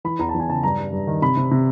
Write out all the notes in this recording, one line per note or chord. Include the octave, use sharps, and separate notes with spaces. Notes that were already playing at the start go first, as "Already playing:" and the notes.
E3 B5
E2 A#5
A5
E2
G#5
C#3 A5
G2 A#5
G3
G2
D#3
C3 B5
C3
C3